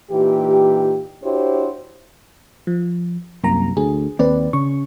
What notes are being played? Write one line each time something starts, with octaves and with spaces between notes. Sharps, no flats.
A#2 E3 D#4 G4
D4 E4 F#4 G4 C5 C#5
F3
C2 F#2 A#3 A#5
D2 G#4
D#2 C4 B4 D5
C#3 C#6